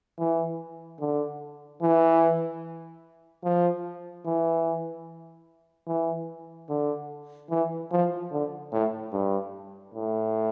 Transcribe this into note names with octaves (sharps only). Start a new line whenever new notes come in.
E3
D3
E3
F3
E3
E3
D3
E3
F3
D3
A2
G2
A2